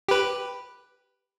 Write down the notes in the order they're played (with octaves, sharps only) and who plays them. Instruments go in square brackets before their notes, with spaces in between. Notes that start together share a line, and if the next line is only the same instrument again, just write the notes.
[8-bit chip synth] G4 B4